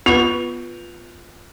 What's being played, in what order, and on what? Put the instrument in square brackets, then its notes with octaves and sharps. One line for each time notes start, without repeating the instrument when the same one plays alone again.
[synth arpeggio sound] B3 [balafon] F4 B4 [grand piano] F7